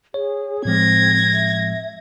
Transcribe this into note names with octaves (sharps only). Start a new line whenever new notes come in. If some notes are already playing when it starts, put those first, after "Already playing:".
G#4 C#5
A2 F3 G#3 C4 G#6 A#6
E5